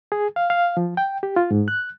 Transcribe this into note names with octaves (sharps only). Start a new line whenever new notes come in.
G#4
F5
F5
F3
G5
G4
F4
G#2
F#6